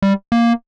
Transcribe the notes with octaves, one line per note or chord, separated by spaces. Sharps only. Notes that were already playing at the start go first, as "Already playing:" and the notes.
G3
A#3